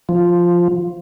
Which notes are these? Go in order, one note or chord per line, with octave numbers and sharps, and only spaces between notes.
F3